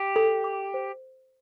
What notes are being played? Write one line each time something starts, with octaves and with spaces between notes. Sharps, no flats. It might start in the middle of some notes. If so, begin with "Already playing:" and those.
Already playing: G4
A4
D6
C5